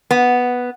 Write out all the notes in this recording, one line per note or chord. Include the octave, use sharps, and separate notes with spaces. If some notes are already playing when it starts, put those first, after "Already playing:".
B3